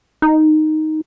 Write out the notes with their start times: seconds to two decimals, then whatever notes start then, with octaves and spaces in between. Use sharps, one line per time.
0.22 D#4